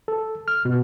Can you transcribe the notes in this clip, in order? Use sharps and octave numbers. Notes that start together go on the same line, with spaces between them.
A4
F6
B2